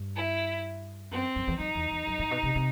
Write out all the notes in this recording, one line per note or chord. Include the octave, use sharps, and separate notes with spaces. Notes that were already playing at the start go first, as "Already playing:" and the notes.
Already playing: G2
E4
F#2 C4
F#2
E2
F#2 D#4
E2
E2
F#2
A2
B2
C3
C3